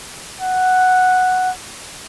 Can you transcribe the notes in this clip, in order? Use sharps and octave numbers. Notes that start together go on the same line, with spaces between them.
F#5